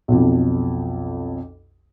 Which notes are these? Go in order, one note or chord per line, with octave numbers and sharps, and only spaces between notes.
B1 F2